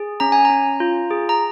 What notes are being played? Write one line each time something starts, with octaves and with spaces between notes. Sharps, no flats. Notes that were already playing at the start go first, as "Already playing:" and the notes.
Already playing: G#4
C#4 A#5
G#5
A#5
C#4
F4
G#4
A#5